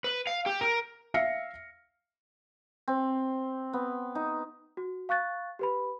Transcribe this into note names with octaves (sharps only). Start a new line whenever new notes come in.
B4
F5
G4
A#4
E5 F5 F6 A#6 C7 C#7
C4
B3
D#4
F#4
F5 C#6 F#6 A6
G4 B4 B5